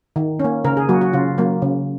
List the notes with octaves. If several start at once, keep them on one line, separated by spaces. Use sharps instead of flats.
D#3
A#3 C#4
C#3 A#4
G#4
F#3 A#3 F#4
F#4
C#3 F4
F#3 A#3
C#3